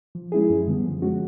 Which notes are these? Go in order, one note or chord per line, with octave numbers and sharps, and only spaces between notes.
F3
G#3 C#4 E4 G#4
F#2
D3 G3 B3
F3
G#3 C#4 F#4